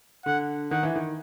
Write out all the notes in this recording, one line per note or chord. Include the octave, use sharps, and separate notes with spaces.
D3 F#5
D#3 F#5
E3
D#3